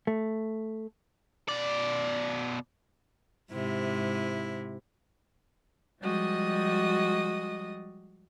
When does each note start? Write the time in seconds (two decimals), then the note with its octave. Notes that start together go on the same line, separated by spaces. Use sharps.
0.07 A3
1.49 B2 D5
3.51 G#2 C3 E4
6.00 F3 G3 G#3 F#4 D#5 D#6